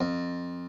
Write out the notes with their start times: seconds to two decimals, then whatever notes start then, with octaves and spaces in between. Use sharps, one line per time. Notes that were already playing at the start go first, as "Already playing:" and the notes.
0.01 F2